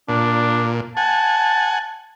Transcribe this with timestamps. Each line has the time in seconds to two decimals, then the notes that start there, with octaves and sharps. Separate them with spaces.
0.09 A#2 D4
0.97 F#5 G#5 A5